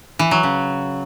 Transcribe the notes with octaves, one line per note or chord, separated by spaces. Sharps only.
E3
F#3
C#3